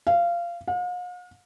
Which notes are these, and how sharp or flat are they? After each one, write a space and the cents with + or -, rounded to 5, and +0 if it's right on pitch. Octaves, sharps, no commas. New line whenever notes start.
F5 -20
F5 +45